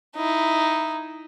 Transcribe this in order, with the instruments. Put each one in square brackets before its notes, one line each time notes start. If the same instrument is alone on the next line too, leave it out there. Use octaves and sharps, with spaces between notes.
[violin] D#4 E4